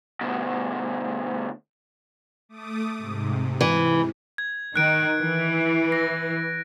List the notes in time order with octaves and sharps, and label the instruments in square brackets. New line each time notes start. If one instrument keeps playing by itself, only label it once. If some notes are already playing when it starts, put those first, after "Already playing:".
[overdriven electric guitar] D2 B2
[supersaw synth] A3 D6 D#6
G#2 C3
[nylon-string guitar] E3
[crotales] G#6
[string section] D#3 [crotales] F#6 D7
[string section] E3
[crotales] A#6